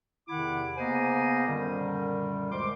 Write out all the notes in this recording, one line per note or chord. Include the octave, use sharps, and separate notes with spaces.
E2 C3 D#3 E4 F#5 D6
C#3 A#3 B3 C5 D#5 G#5
F#2 A#2 D3 D#3 G3
D2 G#3 C5 C6 D6